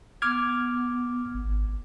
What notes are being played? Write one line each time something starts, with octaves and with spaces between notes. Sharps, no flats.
B3 D6 F6 G#6
G#1